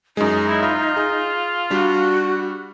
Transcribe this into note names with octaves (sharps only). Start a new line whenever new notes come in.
F#2 G#3 D#4
E4
F4 E5
G#4
G3 D4 F#4